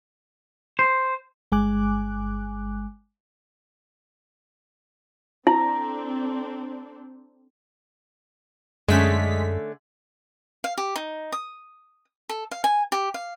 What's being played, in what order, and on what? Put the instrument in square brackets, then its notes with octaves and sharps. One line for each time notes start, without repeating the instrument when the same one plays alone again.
[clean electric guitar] C5
[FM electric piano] G1 G#3 G#5 D6 F#6
[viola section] C4 D4 A4 [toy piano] E4 [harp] A#5
[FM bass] F#2 [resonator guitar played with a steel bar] D3 A3 C#4 [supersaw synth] G#3 B6
[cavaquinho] F5
G4
D#4
D#6
A4
F5
G#5
G4
F5